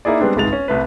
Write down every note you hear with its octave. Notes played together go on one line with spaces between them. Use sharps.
A#3 D#4 E4 G#4 D5
G3 G#3 B3 C4 D4
G1 C2 G#2 G#3 A6 F7
C#4
C2 A3 B4